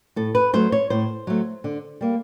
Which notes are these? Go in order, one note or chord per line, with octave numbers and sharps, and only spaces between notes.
A2 A4
B4
F#3 A3 C5
C#5
A2 C5
F#3 A3
D3
G3 A#3